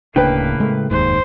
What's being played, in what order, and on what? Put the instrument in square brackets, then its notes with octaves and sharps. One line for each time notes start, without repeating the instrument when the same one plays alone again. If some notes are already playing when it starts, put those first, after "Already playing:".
[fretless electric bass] D1 D4 [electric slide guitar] A2 C#3 [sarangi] A#3 [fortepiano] B4 G5
[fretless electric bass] G#3 A3
[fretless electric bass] F1 D#2 G#2 [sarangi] C5